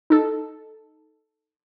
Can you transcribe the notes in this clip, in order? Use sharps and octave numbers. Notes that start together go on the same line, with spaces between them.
D#4 A4